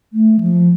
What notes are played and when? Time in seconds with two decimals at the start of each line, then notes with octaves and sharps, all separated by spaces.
0.13 A3
0.40 F3